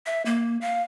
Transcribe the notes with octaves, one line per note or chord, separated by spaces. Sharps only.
E5
A#3
F5